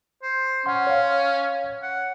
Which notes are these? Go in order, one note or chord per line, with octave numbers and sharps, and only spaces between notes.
C5
C#4 F#5 C6
C#5 F5
F#5